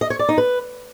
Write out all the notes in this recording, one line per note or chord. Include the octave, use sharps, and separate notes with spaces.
D#5
C#5
D5
D#4
B4